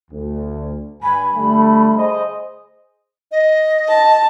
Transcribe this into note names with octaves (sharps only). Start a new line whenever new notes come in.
D2
G2 G#5 B5
D3 G3 A3
G#4 C5 D#5
D#5
A5